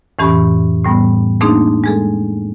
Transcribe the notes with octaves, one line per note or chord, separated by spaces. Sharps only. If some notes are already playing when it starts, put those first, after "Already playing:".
F2 A2 E3 C#4 G4 B5
A2 G3 B3
A3 A#3 C4 D4 D#4 G#4
G#3 G#4 A4